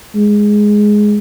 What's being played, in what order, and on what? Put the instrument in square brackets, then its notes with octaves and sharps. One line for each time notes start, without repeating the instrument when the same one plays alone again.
[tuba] G#3